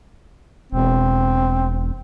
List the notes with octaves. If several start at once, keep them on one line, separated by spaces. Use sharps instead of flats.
E1 C4